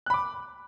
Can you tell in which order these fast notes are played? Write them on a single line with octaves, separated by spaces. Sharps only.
F#6 B5 D6